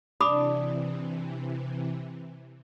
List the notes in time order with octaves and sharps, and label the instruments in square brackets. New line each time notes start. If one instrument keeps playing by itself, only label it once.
[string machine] C3 E3 [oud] D4 [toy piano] B5 D6 D#6